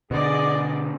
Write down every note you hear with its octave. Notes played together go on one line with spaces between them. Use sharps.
B2 D3 G#4 D5 D#5